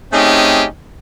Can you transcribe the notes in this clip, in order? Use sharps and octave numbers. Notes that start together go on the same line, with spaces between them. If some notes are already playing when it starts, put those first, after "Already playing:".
A3 C4 C#4 D#4 G4 G#4